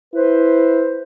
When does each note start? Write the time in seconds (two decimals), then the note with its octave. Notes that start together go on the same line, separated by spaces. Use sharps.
0.14 E4 B4 C5